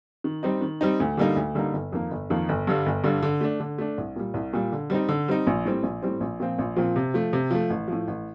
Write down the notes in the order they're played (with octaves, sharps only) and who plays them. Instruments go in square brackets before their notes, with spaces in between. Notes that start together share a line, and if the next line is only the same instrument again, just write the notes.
[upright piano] D#3
G3 C4 D#4
D#3
G3 C4 D#4
D2
D3 G3 A#3 D#4
D2
D3 G3 A#3 D#4
G1
F2 D#3 A#3
G1
F2 D#3 A#3
G1
G2 D3 G3
G1
G2 D3 G3
D3
A3 D4
D3
A3 D4
C2
A#2 G3
C2
A#2 G3
D3
G3 C4 D#4
D3
G3 C4 D#4
A#1
A2 G3 C4
A#1
A2 G3 C4
A#1
A#2 F3 C4
A#1
A#2 F3 C4
C3
F3 A3
C3
F3 A3
A1
A2 F3
A1